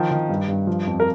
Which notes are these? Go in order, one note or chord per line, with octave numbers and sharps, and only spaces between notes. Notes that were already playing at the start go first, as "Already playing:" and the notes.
Already playing: D#3 F3
D#3
G2
G2
F3
F2
A#4